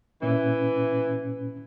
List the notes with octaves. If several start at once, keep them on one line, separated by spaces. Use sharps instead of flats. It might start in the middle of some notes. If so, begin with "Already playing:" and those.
A#2 E3 C#4